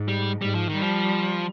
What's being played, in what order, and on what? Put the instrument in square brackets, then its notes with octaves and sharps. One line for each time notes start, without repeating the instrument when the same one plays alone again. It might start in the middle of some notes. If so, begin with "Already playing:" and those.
Already playing: [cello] G#2
[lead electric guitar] G3
[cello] G#2 [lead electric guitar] G3
[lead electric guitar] F3
D#3
[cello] G3
[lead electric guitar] F3